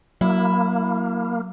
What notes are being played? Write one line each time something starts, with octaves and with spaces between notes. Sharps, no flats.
F#3 A#3 E4